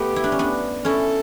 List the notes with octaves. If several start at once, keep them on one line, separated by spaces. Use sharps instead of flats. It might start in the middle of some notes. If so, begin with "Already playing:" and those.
Already playing: A3 B3 G4
E4
D4
C#4
B3 D4
C#4 E4 A4